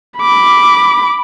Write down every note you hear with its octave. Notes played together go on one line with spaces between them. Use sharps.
B5 D6